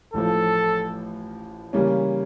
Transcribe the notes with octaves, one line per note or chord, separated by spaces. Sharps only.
A1 A2 F3 A4
C#3 E3 G3 A#3 C#4